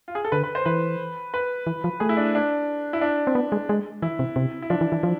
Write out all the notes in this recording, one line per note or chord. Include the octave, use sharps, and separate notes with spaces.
F4
G#4
A4
D3 B4
B4
C5
E3 B4
B4
E3
F3
A3 G#4
E4
D4
D4
E4
D4
C4
B3
G#3
G#3
E3 E4
C3
C3
E4
F3 D4
E3
E3
F3